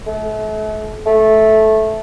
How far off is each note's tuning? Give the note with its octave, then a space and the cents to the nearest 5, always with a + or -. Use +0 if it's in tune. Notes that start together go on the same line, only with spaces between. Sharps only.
A3 -40
A3 -10